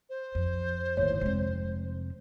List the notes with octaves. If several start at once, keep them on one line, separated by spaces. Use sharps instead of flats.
C5
F2
G1 D#2 A2 C#5
F1 G#3 C4